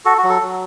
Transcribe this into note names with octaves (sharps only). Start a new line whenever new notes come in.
F#4 A4
F#4
F#3
A4
F#3